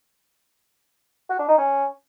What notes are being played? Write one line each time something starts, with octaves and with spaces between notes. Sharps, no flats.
F#4
D4
D#4
C#4